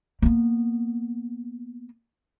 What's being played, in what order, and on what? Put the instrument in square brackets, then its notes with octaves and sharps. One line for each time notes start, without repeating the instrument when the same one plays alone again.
[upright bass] A#3 B3